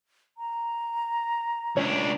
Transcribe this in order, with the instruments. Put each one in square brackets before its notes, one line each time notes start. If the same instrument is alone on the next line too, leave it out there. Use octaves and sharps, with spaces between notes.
[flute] A#5
[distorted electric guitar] C#2 D4 [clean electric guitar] C#5